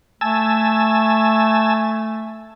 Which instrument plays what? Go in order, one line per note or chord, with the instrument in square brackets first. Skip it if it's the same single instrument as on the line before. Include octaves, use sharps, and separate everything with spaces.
[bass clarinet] A3 [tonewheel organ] G#5 A5 E6